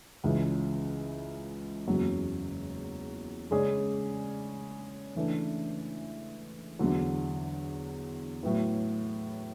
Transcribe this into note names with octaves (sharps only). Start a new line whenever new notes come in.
C#2 C#3 E3
F#1 E2 C#3 F#3
C#3 G#3 C#4 G#4 D5
C#3 E3 A3 D4
E2 D3 F#3
A2 F#3 B3 E4